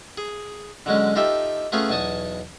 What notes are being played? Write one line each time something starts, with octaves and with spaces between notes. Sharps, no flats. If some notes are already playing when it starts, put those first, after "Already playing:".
G#4
D3 F#3 G#3 C#4
D#4 F4 G4 A4 E5
A3 B3 C#4 F4 G#4 C#5
B1 E2 G#5 A5 C#6 D#6